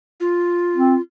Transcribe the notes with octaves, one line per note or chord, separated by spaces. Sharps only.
F4
C4